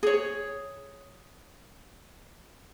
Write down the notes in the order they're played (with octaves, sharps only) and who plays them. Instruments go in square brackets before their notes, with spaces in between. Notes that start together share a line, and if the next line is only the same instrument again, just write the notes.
[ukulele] G#4 C#5